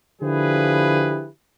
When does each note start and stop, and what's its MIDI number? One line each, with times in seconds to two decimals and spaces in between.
0.22 1.28 50
0.22 1.28 53
0.22 1.28 64
0.22 1.28 67
0.22 1.28 68
0.22 1.28 71